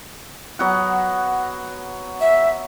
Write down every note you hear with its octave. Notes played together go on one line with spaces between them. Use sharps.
F#3 B3 F#5
E5